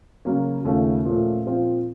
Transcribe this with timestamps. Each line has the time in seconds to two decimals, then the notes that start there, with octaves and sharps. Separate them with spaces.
0.25 C#3 F#3 A#3 C#4
0.65 D#2 C#3 A3 C#4 F4
1.05 A#2 F3 A3 C#4
1.46 A#2 F3 C4 F4